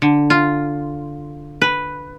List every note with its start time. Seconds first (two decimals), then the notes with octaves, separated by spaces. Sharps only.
0.02 D3
0.30 F4
1.62 B4